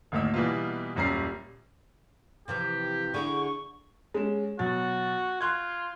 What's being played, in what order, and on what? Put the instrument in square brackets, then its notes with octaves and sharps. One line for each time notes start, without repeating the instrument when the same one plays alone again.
[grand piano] G#1 D2 A#3 D#4 E6
B2 E3 G3 A#3 B3 F4
D#1 F#2 G3 C#4 A#5 C7
[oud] C3 E3 F3 [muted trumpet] G4
[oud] D3 E4 G#4 [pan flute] C#6
[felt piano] G#3 C#4 E7
[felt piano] B2 F#3 A6 [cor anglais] F#4
[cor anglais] F4 [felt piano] C6 F#6 G#6